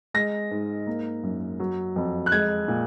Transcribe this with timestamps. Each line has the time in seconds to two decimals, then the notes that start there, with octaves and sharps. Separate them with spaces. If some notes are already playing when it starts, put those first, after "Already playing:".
0.14 G#3 A#6
0.51 G#2
0.87 A#3
1.23 F#2
1.59 F#3
1.96 F2
2.26 F#6
2.32 G#3 G#6
2.68 A#2